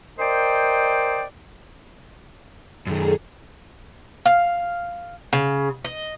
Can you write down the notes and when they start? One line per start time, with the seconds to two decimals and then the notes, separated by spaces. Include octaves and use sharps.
0.19 A#4 C5 D5 D#5 G5
2.87 F#2 D#3 G#4 A4 A#5
4.26 F5
5.33 C#3
5.85 D#5